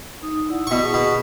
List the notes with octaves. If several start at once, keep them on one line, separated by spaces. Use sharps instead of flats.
D#4 D#6
E4 D5 F#5
B2 C#6
G#4
B2